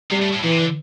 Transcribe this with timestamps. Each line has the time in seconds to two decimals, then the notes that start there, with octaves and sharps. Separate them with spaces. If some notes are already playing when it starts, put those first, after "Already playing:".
0.11 C3 G3
0.22 A2
0.33 A2
0.43 A#2 E3
0.52 C3
0.59 D3